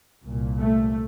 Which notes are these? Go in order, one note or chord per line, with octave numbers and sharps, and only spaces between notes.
C2 A#2
A3